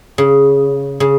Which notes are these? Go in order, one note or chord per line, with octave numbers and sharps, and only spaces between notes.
C#3
C#3